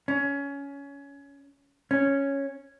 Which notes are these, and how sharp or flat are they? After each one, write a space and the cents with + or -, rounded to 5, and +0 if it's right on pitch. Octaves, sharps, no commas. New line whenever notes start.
C#4 +20
C#4 -5